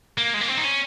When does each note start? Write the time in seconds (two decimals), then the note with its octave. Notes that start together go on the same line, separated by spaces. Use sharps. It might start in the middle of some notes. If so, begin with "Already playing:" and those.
0.18 A#3
0.34 G#3
0.41 A#3
0.49 C4
0.57 D#4
0.65 C#4